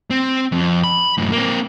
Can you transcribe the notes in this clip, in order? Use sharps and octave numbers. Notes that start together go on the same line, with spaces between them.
C4
F2
B5
F#2 A2
A#3 C4